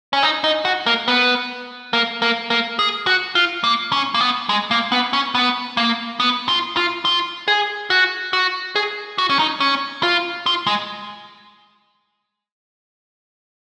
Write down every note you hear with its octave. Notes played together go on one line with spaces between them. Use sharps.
C#4
D#4
D#4
F#4
A#3
B3
A#3
A#3
A#3
G#4
F#4
F4
A#3
C#4
A#3
B3
G#3
A#3
B3
C#4
B3
A#3
B3
F4
F4
F4
G#4
F#4
F#4
G#4
F#4
C#4
D#4
C#4
F4
F4
G#3